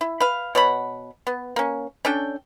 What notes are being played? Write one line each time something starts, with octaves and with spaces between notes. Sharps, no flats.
E4
B4 F5
B2 C#5 F#5 B5
B3
A#3 C#4
C#4 D4 A4 G5